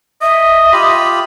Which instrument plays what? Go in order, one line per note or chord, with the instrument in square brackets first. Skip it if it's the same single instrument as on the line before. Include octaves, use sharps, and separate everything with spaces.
[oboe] D#5 [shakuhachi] E5
[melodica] F4 G4 B5